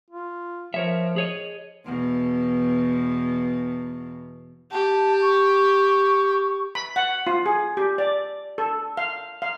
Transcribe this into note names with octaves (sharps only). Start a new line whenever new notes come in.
F4
F3 A#4 C#5 E5
G#4 C#5 D#5
E2 B2
G4 A5
C#6
B5
F#5
F4
G#4
G4
D5
A4
F5
F5